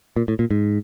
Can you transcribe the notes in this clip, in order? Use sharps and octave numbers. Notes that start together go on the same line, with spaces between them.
A#2
A2
A#2
G#2